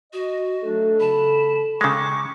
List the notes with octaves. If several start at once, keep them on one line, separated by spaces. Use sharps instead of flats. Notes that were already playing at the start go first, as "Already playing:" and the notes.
F#4 D#5
F#3 A3 D4 A4
C#3 A5 B5
C#3 G#3 G5 A#5 C#6 D6